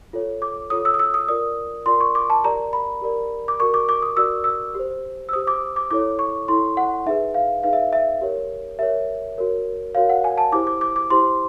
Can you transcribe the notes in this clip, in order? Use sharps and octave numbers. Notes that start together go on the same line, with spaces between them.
F4 A4 C#5
D6
F4 A4 C#5 D#6
E6
D#6
E6
D#6
F4 A#4 D5 D#6
F4 A#4 D5 C6
C#6
D6
A5
G4 A#4 D5 A#5
B5
G4 A#4 D5
D6
F#4 A#4 D5 C#6
D6
D6
D#6
F#4 A#4 D5 E6
E6
G4 C5
E6
G4 C5 D#6
D6
D6
E4 A4 C#5 D6
C#6
E4 A4 C#5 C6
F#5
D#4 G#4 B4 E5
F5
D#4 G#4 B4 F5
E5
E5
G4 A#4 C#5
G4 A#4 C#5 E5
F#4 A#4 C#5
F#4 A#4 C#5 F5
F#5
G#5
A5
E4 G4 C5 D6
D6
D6
D6
E4 G4 C5 C6